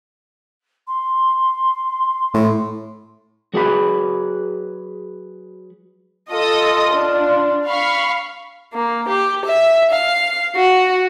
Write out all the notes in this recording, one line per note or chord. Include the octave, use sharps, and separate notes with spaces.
C6
A2
F#3 F#4 G#4 B4 D#5 B5
F4 A4 D#5 D#6
D4
F5 B5 C#6
A#3
G4
E5
F5
F#4